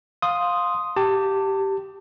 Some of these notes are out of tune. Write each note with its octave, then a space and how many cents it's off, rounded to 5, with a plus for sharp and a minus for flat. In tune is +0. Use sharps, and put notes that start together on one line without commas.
F5 +15 C6 +0 D#6 +0
G4 -10 A5 +25